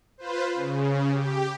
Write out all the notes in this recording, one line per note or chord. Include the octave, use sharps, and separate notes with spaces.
F4 B4 C5
C#3
G4